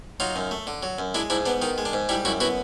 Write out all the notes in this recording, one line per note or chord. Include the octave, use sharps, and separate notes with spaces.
F#3 D#4 F4
F#2
A3
D3
F#3
F#2
G#3 D4 E4
G#2 D4 E4
B3 D4
D#3 D#4
G#3
D4
G#2
G3 D4 E4
F#2 E4 F#4
B3 E4 F#4